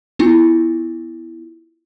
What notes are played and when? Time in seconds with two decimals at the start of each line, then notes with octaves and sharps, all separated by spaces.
0.19 B3 E4 F4